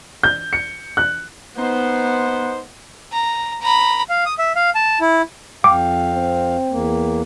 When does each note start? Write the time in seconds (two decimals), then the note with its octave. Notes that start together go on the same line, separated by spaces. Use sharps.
0.23 G6
0.53 C#7
0.97 F#6
1.58 B3 D#4 C5
3.12 A#5
3.61 A#5 B5
4.10 F5
4.26 D#6
4.38 E5
4.56 F5
4.75 A5
5.00 E4
5.64 F2 F5 G5 D6
6.14 C4
6.71 E2 A#3